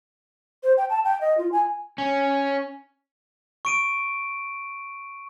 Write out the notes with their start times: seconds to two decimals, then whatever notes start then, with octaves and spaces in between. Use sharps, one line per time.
0.63 C5
0.77 G5
0.90 A5
1.05 G5
1.21 D#5
1.38 F4
1.52 G#5
1.98 C#4
3.65 C#6 D7 D#7